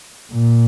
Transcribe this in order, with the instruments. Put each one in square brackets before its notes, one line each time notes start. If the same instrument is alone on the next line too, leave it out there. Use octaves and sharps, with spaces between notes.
[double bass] A#2